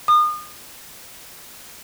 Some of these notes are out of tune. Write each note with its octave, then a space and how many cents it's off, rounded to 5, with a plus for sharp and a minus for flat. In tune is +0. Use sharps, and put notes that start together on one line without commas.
D#6 -35